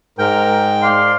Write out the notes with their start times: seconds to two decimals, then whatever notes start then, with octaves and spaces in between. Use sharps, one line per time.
0.18 G#2 A#4 G5
0.82 D5 F5 C6